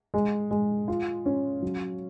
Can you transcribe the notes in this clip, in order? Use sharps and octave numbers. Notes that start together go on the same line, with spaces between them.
G#3
G#3
F4
C#4
F#3